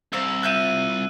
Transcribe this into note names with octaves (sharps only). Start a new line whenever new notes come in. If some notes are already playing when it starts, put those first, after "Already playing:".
C2 C5 F5 E6
F4 E5 F#6 G6 D#7